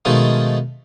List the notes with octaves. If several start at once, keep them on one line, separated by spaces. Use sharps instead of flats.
B2 D#3 F3 G#3 A3 D#4